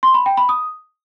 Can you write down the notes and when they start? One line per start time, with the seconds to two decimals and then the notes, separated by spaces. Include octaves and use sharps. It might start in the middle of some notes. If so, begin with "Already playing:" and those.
0.03 C6
0.14 B5
0.26 G5
0.37 B5
0.49 D#6